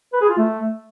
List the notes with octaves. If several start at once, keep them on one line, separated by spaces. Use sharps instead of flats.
B4
G#4
F4
A3